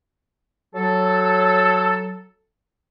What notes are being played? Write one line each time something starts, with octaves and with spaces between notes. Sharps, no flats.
F#3 A4